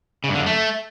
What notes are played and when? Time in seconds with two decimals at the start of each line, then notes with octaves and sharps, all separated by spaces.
0.24 C#3
0.29 G2
0.35 D3
0.41 F#2
0.46 A3